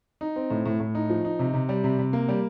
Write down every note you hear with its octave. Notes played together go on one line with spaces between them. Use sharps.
D#4
C4
A2
A2
A2
D#4
F3
D#4
C3
C3
G3
C3
C3
A#3
G3